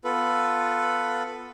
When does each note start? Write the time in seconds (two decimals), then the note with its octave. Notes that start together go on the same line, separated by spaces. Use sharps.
0.04 B3 F4 A4 B4